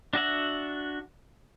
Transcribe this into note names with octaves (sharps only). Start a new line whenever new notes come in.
D4 F#4 E5 F#5